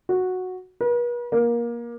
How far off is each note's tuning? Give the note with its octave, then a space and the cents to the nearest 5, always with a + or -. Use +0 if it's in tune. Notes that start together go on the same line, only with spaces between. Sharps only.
F#4 -5
B4 -45
A#3 +20